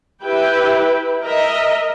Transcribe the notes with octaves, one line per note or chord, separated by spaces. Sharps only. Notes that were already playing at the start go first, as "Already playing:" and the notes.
E4 G4 B4 G5
A#4 D#5 E5